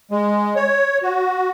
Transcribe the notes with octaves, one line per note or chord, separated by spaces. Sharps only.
G#3
C#5
F#4